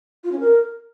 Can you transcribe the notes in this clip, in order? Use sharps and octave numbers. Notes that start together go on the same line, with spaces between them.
F4
C#4
A#4